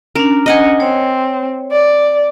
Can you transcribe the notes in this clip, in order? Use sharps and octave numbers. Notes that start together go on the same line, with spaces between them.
C#4 D4 A#4
D#5 F#5 G#5
C4 C#5
D5